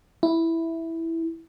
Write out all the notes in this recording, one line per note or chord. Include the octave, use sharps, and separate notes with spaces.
E4